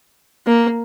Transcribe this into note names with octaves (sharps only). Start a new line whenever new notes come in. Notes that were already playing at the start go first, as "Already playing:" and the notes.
A#3